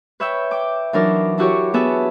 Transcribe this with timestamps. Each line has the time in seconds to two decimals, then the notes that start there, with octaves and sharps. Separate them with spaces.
0.20 B4 C#5 E5 G5 E6 G6
0.51 G5 D6
0.93 E3 F#3 D4 D#4 A#4 D5
1.38 D4 E4 F#4 G4 C#5
1.74 B3 F#4 G#4 B4 E5 A5